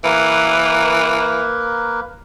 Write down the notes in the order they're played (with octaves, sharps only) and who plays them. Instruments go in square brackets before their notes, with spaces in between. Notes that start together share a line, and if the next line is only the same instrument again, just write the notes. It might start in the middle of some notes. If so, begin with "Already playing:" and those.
[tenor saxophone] E3 [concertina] A#3 A#4 B4